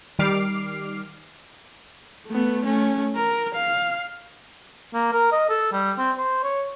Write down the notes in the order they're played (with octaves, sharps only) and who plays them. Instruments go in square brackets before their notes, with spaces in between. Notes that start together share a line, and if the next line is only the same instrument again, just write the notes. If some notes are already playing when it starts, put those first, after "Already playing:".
[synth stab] D#3 G3 D6 F6 C7
[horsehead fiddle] A3 B3
A3 C#4
A#4
F5
[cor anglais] A#3
A#4
D#5
A4
G3
C4
C5
C#5